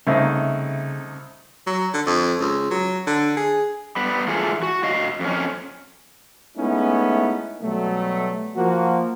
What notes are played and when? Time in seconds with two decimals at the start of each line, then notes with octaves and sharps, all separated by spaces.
0.07 C2 C#3 A3 D#4
1.66 F#3
1.94 D3
2.06 F2
2.40 C#2
2.70 F#3
3.07 D3
3.37 G#4
3.96 G3 B3
4.28 G#2 E3 F4 G#4 A4
4.63 F#4
4.83 F#4 D#5 F5
5.20 F2 C#4
6.57 G#3 A3 B3 C#4 D#4 E4
7.61 B2 F#3 G3 A3
8.56 F3 A#3 F#4